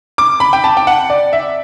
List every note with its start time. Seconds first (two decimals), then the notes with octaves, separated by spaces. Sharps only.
0.18 D6
0.40 B5
0.53 G5
0.64 A5
0.77 G5
0.87 F#5
1.10 D5
1.33 E5